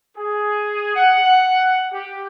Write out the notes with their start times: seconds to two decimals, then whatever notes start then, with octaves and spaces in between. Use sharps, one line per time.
0.17 G#4
0.96 F#5
1.92 G4